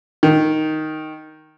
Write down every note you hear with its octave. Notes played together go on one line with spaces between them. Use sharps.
D#3